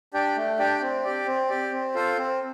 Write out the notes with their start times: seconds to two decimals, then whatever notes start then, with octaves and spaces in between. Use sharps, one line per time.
0.14 D4 G4 D5 G5
0.36 A3
0.59 D4 G4 D5 G5
0.82 C4
1.04 G4 D5
1.27 C4
1.49 G4 D5
1.72 C4
1.94 F4 A4 C5
2.17 C4